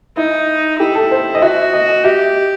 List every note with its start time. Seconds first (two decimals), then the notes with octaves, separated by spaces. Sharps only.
0.17 D#4 E4
0.79 E4 G4
0.95 A4
1.11 C5
1.35 D#5
1.42 F#4 E5
1.73 D#5
1.89 D#5
2.04 G4 E5